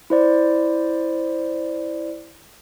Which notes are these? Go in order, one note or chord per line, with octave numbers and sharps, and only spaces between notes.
E4 C5 D5